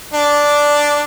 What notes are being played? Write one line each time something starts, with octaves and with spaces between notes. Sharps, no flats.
D4 D5